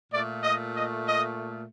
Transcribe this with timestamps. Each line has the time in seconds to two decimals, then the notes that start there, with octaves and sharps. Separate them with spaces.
0.12 A#2 A3 D5
0.43 D#5
0.75 D#5
1.07 D#5